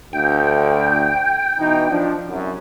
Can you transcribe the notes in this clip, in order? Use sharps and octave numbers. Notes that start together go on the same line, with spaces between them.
D2 G5
B2 E3 D#4
F3 D4
C2 F#2